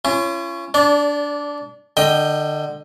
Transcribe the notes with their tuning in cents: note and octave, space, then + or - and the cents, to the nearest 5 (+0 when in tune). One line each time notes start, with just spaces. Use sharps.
C#4 +0 F4 -45
D4 -15 D5 -35
D3 +25 D#5 +0 G5 +0